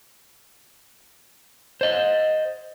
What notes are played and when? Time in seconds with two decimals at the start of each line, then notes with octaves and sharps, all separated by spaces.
1.81 C5 D#5